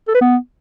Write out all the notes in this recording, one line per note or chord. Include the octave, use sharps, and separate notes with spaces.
A4
B4
B3